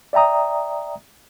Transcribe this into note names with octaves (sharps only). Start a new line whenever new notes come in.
D5 E5 G5 A#5 D#6